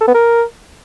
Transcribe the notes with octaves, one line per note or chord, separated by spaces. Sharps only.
A4
B3
A#4